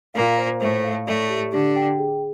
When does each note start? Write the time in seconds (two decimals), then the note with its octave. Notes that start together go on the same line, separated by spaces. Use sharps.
0.14 A#2 A#3 F5
0.37 C5
0.60 A2 A3 C5
0.84 F5
1.06 A2 A3 D5
1.29 G4
1.52 D3 D4 G4
1.76 G5
1.99 G#4